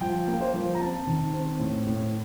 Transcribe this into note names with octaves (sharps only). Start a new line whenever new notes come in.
F3 G5
A#3
C5
F3
A#5
C4 A5
D#3
C4
A2
A2